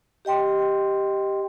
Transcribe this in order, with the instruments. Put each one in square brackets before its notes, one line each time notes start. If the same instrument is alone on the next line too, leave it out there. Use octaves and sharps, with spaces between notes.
[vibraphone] G4 D#5 G5 C6